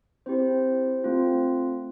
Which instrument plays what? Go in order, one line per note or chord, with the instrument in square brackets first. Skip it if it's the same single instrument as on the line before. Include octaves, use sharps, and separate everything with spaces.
[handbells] C4 E4 G4 C5
A3 C4 F4